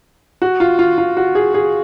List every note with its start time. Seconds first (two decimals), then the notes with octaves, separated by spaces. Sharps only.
0.42 F#4
0.60 F4
0.79 F4
0.98 F4
1.17 F#4
1.35 G#4
1.54 G#4